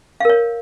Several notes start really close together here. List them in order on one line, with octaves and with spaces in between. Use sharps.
F5 A#4 C#5